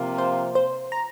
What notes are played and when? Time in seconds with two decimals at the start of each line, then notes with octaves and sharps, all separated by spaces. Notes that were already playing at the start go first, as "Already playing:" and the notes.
Already playing: C3 F3 A#3 F4
0.18 C5
0.55 C5
0.92 A#5